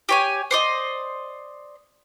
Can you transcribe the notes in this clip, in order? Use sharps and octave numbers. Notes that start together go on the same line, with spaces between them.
G4 C#5 G#5
C5 D5 D#5